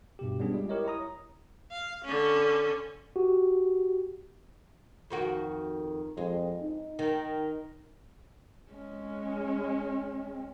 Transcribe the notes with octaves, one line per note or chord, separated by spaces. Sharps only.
G2 B2 G4
G3 B3 C#4 D4 G#4
G3 G#3 F4
E4 G4 A#4 C#5 D#5
E4 C#5 A#5 D#6
F5
D3 C#4
F#4 G4
F2 D#3 F#4
F2 G#3
D#4
D#3
G#3 C#4